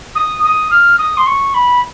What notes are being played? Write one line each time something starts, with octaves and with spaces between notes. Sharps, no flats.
D#6
D#6
F6
D#6
C6
C#6
B5